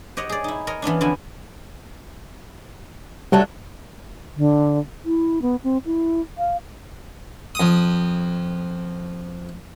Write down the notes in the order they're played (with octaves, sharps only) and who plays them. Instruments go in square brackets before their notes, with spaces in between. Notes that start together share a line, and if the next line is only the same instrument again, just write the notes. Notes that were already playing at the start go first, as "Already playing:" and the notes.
[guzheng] G4 C#5 D#5 F#5
G#4 D5
D#4 E4
A#4 C#5 D#5
E3 B3 C#4 D4
F2 D3 B3 E4 F#4 G#5
[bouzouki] F#3 A3 D4 [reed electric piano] G3
[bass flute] D3
E4
B3
C4
E4
F5
[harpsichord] F2 D#6